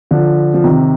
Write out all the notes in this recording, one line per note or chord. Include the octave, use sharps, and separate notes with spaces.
D3 F3
F3
C3 D#3